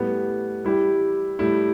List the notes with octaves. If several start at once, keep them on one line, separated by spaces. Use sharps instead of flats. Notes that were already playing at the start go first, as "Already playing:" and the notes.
Already playing: A2 G3 B3
G3 E4 G4
A2 G3 E4